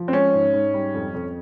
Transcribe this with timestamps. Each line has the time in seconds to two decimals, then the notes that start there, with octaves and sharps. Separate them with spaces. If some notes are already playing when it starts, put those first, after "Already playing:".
Already playing: F3
0.08 C4
0.12 G#3 C#4
0.34 G#2
0.53 G#2
0.74 G3
0.94 F2
1.14 F2